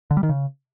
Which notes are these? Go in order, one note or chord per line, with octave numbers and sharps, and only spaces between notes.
D3
G3
D#3
C#3